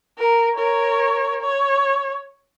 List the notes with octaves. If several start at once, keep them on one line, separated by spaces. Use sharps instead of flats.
A#4
A#4 C#5
C#5